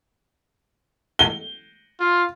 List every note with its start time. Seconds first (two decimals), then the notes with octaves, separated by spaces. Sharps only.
1.19 G7
2.00 F4